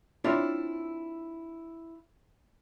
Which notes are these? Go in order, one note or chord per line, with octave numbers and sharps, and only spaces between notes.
C4 D4 E4 F4 C#5 D5